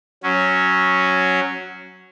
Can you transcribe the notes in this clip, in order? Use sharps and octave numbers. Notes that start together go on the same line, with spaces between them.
F#3 C#4